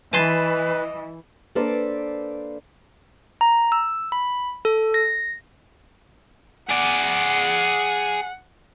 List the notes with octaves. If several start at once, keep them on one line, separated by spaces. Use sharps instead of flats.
E3 B4 D#5 G#5 A5 C6
A#3 D4 A4 B4 C5 D5
A#5
E6
B5
A4
A#6
G#4 D5 F#5